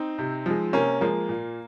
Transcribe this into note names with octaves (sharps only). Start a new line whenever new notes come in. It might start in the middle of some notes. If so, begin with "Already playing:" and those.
Already playing: C4 D#4
C3
F3 G#3
C3 A#3 C#4
F3 G#3 A#3
A#2